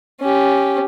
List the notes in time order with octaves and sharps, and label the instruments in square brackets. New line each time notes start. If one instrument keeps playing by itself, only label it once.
[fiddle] C#4 G4